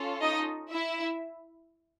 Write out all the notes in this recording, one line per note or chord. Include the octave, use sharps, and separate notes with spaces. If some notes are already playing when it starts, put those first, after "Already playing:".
Already playing: C#4 F4 A4
D#4 D#5
E4 E5